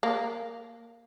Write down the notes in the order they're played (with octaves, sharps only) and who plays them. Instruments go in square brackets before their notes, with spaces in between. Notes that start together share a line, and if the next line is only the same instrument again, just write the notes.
[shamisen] A#3